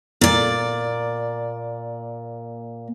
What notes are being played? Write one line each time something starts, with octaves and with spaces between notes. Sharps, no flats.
A#2 D5